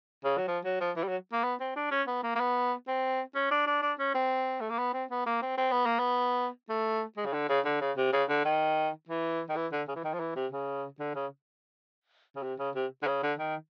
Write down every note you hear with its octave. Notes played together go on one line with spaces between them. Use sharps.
C#3
F#3
F3
F#3
F3
E3
G3
F#3
A#3
B3
C4
D4
C#4
B3
A#3
A#3
B3
C4
C#4
D4
D4
D4
C#4
C4
A3
A#3
B3
C4
B3
A#3
C4
C4
B3
A#3
B3
A3
G#3
C#3
D3
C#3
D3
C#3
C3
C#3
D3
D#3
E3
D#3
E3
D3
C#3
E3
D#3
F3
E3
C3
C#3
D3
C#3
C#3
C3
C#3
C3
D3
C#3
D3
D#3